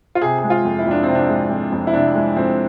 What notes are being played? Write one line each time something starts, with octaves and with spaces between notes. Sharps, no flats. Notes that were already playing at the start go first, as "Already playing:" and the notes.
F4
C3 G#4
G#3 G#4
F4
F2
E4
F2 D4
C4
C3
D4
G#3
F2
F2
E4
C3 D4
G#3
F2 C4